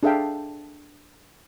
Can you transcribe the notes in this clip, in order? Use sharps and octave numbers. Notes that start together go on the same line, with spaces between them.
D4 G#4 A4 E5 F5 G5